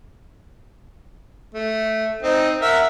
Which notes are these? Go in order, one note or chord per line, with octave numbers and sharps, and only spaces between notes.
A3
C4 D#4
A#4 E5 F#5